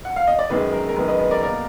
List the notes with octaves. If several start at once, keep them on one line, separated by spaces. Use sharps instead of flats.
F#5
F5
D#5
D5
F#2 D#3 G#3 B4
A#4
A#4
F#2 D#3 G#3 B4
B4 D#5
B4
A#4 D5
B2 A#3 A#4 D5